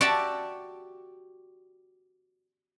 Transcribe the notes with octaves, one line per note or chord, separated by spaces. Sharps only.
F#4 G4 D5 E5 A5